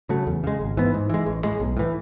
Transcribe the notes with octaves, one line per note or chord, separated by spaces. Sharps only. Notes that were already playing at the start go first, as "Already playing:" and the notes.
C#3 F#3 A3
E2
C#3 G#3
G#1
G#2 E3 B3
G#2
E3 G#3
A1
A2 G#3
B1
A2 E3